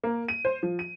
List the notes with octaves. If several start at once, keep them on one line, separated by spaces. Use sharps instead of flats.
A#3
D#7
C5
F3
D#7